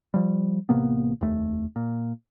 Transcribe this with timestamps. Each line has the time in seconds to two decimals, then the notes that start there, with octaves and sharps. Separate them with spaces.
0.14 F3 G3
0.69 A1 C3 A#3 B3
1.21 F1 D#2 A3
1.76 A#2